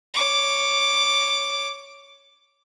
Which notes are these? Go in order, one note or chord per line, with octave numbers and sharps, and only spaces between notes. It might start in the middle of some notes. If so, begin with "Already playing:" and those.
C#5 D6